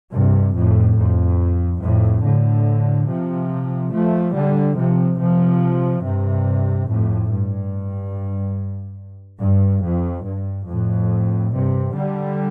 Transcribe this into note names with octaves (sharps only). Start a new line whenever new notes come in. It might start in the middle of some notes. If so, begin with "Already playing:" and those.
G2 C3
F2 A2
F2
F2 A2
A2 D3
C3 F3
F3 A3
D3 G3
C3 F3
C3 F3
G2 C3
F2 A2
G2
G2
F2
G2
F2 A2
G2 C3
D3 G3